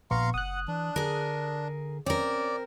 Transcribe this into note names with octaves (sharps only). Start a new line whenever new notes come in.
A#1 B3 F5 A#5 C6 C#6
F#1 F#5 D#6 F#6
E3 D4
D3 G#4 A#4
C4 C#4 A#4 D5